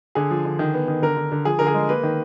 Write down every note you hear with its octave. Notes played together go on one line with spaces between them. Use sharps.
D3 G#4
F3
D3
D#3
B3
D#3
D3 A#4
D3
D3
F3 G#4
D3 A#4
G#4
G#3
A#3 B4
D#3